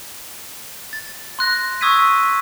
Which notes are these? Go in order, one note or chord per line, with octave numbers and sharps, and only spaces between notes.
A6
C6 F#6 A#6
C#6 D#6 E6 G#6 B6 D#7